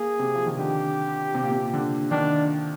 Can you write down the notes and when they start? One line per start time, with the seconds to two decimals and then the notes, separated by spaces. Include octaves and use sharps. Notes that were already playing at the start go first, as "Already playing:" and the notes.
Already playing: A#3 G#4
0.19 C3
0.34 F3
0.46 D#3
0.57 D3 G4
1.35 C3
1.43 A#2
1.51 C3
1.73 D3
2.11 D#3 D4